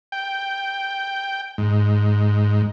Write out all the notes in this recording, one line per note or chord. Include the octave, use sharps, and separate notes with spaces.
G5
G#2